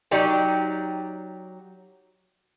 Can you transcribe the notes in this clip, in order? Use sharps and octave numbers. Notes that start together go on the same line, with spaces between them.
F#3 D#4 G4 D5 D#5 G5